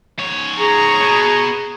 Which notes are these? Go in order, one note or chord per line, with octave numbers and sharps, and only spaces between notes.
G#2 C#5
G#4 A#5 C#6
B2